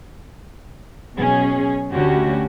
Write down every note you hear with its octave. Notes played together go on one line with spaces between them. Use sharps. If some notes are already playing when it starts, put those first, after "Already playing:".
B2 F#3 C#4 G#4
D2 D3 C#4 F#4 G4